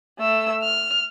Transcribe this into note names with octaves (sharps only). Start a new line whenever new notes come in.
A3 E6
F6